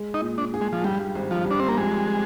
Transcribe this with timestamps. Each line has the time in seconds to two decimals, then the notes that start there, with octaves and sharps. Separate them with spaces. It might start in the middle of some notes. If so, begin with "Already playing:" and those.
Already playing: G#3
0.14 D#4
0.22 A#2
0.38 D4
0.54 G#4
0.61 G#3
0.73 F3
0.84 G2 G3
1.15 G#1
1.31 F3
1.46 G3 D4
1.60 C4
1.68 A#3
1.77 F2 G#3